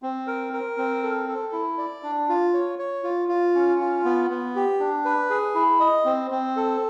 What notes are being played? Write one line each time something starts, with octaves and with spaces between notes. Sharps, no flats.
C4
A#4
A#4
C4
A4
A4
E4
D5
D4
F4
C#5
C#5
F4
F4
C#4
F4
B3
B3
G4
D4
B4
G#4
E4
D#5
C4
C4
A4